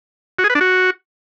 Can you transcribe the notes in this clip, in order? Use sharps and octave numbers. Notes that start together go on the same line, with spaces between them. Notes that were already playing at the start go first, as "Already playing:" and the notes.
F#4
G#4
B4
D4
F#4